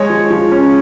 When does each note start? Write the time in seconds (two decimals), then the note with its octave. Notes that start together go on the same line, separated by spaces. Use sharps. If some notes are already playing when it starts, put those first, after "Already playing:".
Already playing: G#3 C#5
0.10 F3
0.30 F3
0.52 C#4